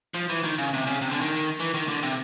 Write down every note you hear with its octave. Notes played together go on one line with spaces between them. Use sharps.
F3
E3
D#3
C#3
C3
C#3
C3
D3
D#3
E3
D#3
D3
C3